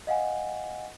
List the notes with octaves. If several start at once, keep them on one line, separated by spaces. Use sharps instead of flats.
D#5 F5 F#5 G#5